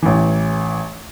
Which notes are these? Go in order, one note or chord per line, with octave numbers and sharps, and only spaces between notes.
A1 E3